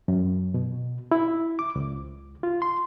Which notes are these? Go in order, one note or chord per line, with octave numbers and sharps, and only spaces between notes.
F#2
B2
E4
D6
C#2
F4
C6